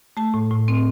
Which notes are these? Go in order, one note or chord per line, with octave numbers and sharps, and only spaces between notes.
A3 A5
A2
A2
C4